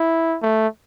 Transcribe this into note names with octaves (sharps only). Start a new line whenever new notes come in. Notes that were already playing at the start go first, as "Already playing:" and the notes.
Already playing: E4
A3